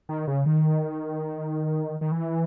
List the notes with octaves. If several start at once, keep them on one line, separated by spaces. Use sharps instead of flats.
D#3
C#3
D#3
D#3
E3